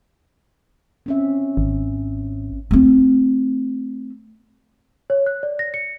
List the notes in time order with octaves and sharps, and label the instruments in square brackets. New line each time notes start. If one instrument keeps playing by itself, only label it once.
[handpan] C4 C#4 E5
[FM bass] G#1
[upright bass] A3 C4
[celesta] C#5
F#6
D5
A#6
C#7